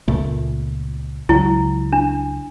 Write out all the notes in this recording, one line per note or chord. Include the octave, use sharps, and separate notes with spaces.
C#2 A#2 A3
C#2 F#3 E4
D4